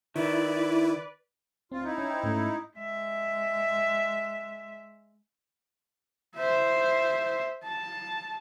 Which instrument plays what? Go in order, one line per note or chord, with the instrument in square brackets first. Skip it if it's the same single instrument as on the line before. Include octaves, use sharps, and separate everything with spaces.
[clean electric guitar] D#3 [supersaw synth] E4 [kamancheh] B4 D5
[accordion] D2 F4 [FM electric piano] C4
[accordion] D#4 E4
[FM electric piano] C#4 G#5
C5 G5
G#2 A3 C#4
[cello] G#3 E5
[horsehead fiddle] C5 E5
A5